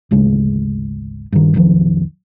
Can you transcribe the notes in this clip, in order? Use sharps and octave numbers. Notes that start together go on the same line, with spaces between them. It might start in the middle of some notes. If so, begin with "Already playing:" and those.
G#1 D2 C#3 G#3
G2 D#3
F1 B1 D#3 F3